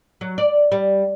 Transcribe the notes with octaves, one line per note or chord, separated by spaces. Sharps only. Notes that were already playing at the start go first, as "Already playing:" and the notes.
F#3
D5
G3